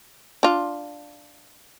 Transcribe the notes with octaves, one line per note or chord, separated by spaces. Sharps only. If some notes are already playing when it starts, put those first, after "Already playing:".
D4 F4